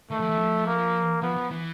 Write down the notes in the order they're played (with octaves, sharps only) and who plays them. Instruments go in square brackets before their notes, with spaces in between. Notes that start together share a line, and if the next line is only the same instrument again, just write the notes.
[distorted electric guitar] D#3 [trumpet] A3
[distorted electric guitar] F3
E3
F3
[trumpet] A#3
[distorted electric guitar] F3 [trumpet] B3
[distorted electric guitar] F3
E3